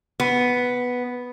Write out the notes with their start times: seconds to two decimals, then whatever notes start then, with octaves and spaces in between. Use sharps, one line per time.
0.20 B3